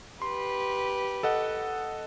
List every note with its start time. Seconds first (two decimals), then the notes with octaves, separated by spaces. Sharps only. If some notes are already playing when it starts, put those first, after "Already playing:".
0.22 G4 B4 C6
1.23 A4 D#5 F#5